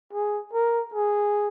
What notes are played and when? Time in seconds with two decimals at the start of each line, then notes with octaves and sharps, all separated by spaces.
0.13 G#4
0.53 A#4
0.94 G#4